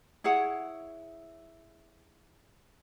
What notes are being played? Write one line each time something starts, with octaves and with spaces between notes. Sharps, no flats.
E4 G#4 C#5 F#5